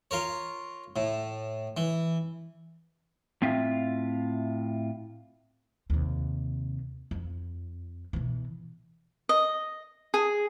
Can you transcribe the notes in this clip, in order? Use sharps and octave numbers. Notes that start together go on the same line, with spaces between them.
F4 A#4 C#5
A2
E3
A2 C4 F4 E5
D#2 C3
F2
B2 E3
D#5
G#4